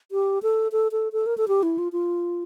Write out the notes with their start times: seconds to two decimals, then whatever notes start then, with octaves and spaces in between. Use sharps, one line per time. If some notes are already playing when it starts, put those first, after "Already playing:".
0.12 G4
0.43 A4
0.72 A4
0.92 A4
1.13 A4
1.26 A#4
1.38 A4
1.48 G4
1.63 E4
1.78 F4
1.92 F4